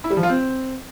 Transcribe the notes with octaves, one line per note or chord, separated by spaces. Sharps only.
E4
G3
F3
F4
C4